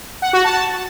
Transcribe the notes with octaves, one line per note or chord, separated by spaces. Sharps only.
F#5
F#4
A5